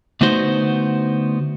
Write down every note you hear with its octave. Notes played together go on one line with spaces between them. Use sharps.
D3 A3 B3 D#4 F#4 C5